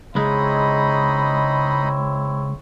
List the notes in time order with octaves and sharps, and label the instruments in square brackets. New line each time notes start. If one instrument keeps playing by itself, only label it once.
[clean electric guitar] C#2 G#3 [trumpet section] C4 E4 C#5 [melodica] D#4 D#5 B5